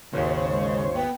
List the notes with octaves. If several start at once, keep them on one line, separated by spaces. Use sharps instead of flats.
G#1 D#2 C#3 C5 C#5
G#3
B3 G5